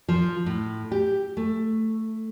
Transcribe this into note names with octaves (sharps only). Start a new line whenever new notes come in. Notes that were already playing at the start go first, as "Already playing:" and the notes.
F3
A2
G4
A3